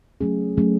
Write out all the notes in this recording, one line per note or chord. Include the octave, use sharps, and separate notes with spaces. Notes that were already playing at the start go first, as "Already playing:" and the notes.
F#3 A3 C#4 G#4
F#3 A3 C#4 G#4